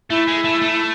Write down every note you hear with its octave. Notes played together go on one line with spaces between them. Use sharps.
A3 E4
G#3
A3
A3